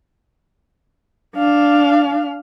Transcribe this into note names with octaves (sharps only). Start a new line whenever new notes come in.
D4 F5